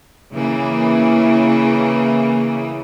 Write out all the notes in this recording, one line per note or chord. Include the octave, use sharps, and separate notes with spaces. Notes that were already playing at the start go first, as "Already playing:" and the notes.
C#3 E3 A#3